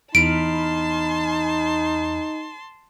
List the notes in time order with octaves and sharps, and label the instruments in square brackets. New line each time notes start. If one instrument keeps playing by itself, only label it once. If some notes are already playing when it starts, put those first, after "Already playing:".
[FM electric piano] E2 B5 F6 [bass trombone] D#4 [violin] A5 C6 [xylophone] D7